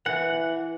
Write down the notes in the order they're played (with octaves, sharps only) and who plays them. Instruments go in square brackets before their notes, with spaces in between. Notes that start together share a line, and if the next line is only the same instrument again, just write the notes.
[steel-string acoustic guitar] E3 [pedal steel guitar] F#5